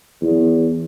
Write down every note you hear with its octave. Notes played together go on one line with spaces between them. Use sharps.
E2